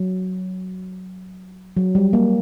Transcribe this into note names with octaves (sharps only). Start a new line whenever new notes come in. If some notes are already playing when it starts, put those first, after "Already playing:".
Already playing: F#3
F#3
G3
A#3